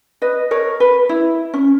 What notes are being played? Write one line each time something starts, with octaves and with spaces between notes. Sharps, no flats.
B4 D#5
A#4 C#5
B4
E4
C#4